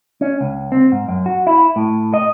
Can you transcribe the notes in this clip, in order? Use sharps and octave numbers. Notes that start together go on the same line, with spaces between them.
C#4
C#2
C4
G#2
F#2
F#4
E4
A2
D#5